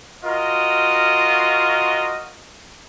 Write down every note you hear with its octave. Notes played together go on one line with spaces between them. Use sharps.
F4 F#4 A#4 D#5